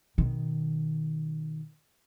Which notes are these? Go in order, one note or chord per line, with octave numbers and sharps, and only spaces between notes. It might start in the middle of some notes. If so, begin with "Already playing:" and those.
B2 D#3